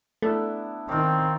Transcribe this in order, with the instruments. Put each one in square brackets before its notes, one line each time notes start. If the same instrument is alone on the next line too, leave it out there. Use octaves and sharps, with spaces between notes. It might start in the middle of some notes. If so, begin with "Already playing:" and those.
[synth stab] A3 [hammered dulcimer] B3 D4 E4
[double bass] D#3 [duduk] C4 [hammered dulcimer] F4 A#4 C#5